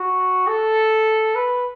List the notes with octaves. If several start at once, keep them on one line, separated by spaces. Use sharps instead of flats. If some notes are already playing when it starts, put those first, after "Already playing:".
Already playing: F#4
A4
B4